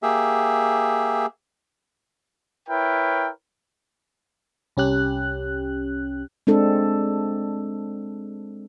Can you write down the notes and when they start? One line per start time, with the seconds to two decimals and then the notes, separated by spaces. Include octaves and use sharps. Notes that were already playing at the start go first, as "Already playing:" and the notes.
0.03 A#3 G4 G#4 E5
2.69 E4 A#4 B4 C#5 G5
4.77 C2 C#4 G4 F#6
6.47 G#3 C4 D4 A4